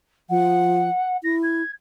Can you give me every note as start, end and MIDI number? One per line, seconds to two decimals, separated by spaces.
0.29 0.89 53
0.29 1.17 78
1.23 1.62 64
1.23 1.35 94
1.43 1.71 92